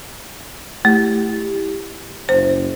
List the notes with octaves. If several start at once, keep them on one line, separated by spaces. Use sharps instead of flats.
A3 E4 G4
F#1 C5